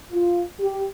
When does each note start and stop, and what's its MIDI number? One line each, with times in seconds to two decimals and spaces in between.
0.12 0.43 65
0.60 0.84 67